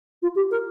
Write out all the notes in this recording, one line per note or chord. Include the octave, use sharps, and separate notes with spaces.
F4
G4
A#4